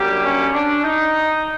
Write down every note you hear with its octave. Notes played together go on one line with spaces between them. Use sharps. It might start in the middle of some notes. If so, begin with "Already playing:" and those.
Already playing: F#2 D3 G3 A#3 G4
C#4
D4
D#4